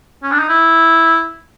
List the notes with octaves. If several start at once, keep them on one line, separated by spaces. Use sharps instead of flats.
C#4
D4
D#4
E4